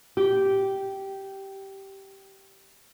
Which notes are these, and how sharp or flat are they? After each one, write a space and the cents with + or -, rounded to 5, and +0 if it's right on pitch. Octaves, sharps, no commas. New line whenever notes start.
G4 -10